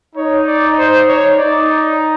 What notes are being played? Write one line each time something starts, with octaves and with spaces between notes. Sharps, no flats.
D#4 C#5
D5
C5
C#5
D#4 D5